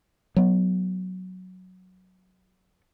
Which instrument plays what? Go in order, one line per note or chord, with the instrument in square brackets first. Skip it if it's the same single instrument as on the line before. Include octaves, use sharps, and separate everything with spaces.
[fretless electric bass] F#3 B3